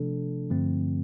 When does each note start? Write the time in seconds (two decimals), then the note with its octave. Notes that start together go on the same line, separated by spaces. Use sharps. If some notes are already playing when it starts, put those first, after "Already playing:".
Already playing: C3 F3 A3 D4 A4
0.50 G2 D3 F3 A3 C4